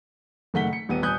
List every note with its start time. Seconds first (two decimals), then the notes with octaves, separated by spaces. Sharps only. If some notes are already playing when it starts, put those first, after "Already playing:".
0.54 F#1 D#3 A3 F#5 B6 G7
0.73 C#7
0.89 D#1 B3 D#7
1.03 D#1 G#5 D#6 F#6 G6